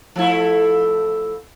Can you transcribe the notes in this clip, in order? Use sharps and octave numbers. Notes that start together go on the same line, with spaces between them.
F3 A3 E4